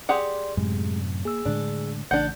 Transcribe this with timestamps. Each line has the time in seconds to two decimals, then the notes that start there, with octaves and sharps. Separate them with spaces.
0.09 G4 G#4 D5 F#5 C6
0.57 F#2 A2 C3 G#3
1.25 A#3 G#4 E6
1.45 A2 D3 G#3 D4
2.11 A1 A2 C#3 D4 F#5 G6